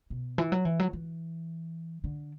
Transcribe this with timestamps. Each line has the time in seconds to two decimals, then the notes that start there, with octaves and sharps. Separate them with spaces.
0.10 B2
0.38 E3
0.52 F#3
0.65 E3
0.79 F#3
0.93 E3
2.04 D3